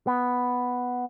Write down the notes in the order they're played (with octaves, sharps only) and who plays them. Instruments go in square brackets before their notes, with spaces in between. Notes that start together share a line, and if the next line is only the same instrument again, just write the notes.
[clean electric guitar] B3